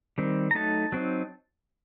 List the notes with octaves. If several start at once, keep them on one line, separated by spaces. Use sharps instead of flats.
D#3 G3 C4
A#5
F#3 A3 D#4 A5
F#3 C4 D#4